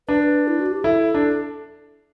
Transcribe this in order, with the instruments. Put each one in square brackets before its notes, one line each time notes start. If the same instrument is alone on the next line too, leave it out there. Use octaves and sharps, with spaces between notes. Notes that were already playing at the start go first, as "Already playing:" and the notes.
[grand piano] D4 [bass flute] B4
[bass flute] B4
E4
F#4
G4
[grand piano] E4 [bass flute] A4
[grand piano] D4